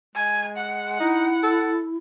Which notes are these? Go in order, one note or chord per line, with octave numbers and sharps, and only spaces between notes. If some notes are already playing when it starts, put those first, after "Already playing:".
G#3 G#5
F#5
D#4 E4
A4